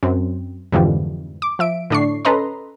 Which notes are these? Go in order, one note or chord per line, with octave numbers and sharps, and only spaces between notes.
F#2 C4
F2 G#2 D3 E3 F3 G3
D6
F3 E5 D7
A2 D3 D4 D5 C#6 C7
C#4 A4 B4 D#5 A#5 C6